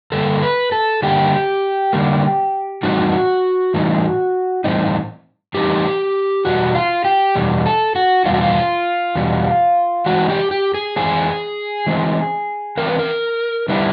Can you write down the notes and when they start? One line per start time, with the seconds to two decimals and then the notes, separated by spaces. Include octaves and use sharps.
0.12 D3 G3 A#3 A4
0.42 B4
0.72 A4
1.02 D3 G3 A#3 G4
1.93 D3 G3 A#3
2.83 A2 E3 G3 C4 D#4 F#4
3.74 A2 E3 G3 C4 D#4
4.64 A2 E3 G3 C4 D#4
5.54 A2 E3 G3 C4 D#4 G4
6.45 E2 B2 G3 F#4
6.75 F4
7.05 G4
7.35 E2 B2 G3
7.66 A4
7.96 F#4
8.25 E2 B2 G3 F4
8.34 F#4
8.41 F4
9.15 E2 B2 G3
10.06 E3 G#3 C4 F#4
10.30 G4
10.51 G4
10.74 G#4
10.96 E3 G#3 C4 G#4
11.87 E3 G#3 C4
12.77 E3 G#3 C4 A#4
12.88 B4
12.99 A#4
13.68 D3 G3 B3 E4